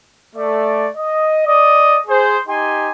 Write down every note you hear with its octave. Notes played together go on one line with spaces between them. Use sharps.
A3 D5
D#5
D5 D#5
G#4 C5
D#4 G4 G#5 C6